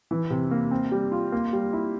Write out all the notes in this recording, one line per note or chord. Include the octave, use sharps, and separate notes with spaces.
E3
C3
A#3
C4
G3
F4
A#3
G3
E4